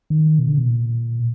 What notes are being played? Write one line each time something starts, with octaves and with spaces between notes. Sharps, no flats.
D#3
B2
D3
B2
A#2